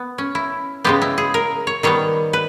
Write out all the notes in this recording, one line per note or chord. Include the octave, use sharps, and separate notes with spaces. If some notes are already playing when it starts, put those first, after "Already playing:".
Already playing: B3
C#4
E4
C#3 G#3 B3 G4
E4
G#4
A#4
C#5
D#3 G3 B3 C#5
B4